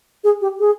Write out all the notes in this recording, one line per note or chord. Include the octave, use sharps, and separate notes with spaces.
G#4
G4
G#4